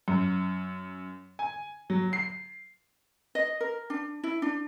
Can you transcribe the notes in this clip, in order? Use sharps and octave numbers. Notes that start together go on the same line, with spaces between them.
F#2
G#5
F#3
C7
D#5
A#4
D4
E4
D4